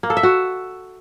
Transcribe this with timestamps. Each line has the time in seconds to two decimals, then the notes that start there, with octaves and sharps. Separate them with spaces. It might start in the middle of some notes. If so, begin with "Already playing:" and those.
0.03 A#3
0.10 A4
0.17 E5
0.23 F#4